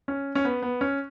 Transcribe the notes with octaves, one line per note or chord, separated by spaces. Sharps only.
C#4
C#4
B3
B3
C#4